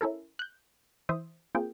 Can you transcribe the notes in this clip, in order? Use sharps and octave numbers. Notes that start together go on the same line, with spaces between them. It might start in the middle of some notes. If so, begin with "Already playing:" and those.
C#4 E4 A4 A#4
F#6 G6
E3 C5 E5 D#6
A#3 C4 F4 G#4 G5